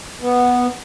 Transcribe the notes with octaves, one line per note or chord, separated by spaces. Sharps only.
B3